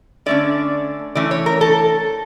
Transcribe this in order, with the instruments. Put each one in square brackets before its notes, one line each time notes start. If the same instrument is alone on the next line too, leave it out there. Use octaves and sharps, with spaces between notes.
[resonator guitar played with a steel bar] D3 A3 C#4 D5
E3 A3 C#4 D5
C#5
A#4
A4